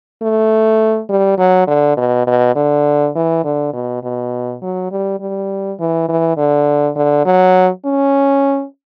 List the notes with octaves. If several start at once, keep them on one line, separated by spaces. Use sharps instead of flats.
A3
G3
F#3
D3
B2
B2
D3
E3
D3
B2
B2
F#3
G3
G3
E3
E3
D3
D3
F#3
C#4